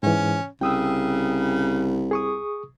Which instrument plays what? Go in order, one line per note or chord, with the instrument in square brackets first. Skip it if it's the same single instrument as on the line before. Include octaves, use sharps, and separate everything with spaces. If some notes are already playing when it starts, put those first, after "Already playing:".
[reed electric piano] G#2 E3 [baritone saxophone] C#4
[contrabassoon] C2 [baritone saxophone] C#3 [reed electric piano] G5 D#6 E6
[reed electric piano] G#4 C#6 D#6